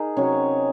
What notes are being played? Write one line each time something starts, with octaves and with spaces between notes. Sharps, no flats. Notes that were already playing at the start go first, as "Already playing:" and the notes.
Already playing: D#4 G#4 A#4
C3 F#3 C#4